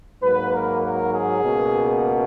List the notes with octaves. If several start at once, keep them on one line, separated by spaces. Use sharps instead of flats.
G#2 F#3 A#3 B4
A#4
A#4
G#4
C#2 B2 A#3